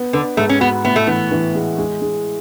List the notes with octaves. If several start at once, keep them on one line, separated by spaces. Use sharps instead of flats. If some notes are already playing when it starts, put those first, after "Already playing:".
Already playing: B3
D3 B3
G#2 A3
C#4
B3 F#4
A2 B3
A3
E3 B3
E3
G#3
G#3
G#3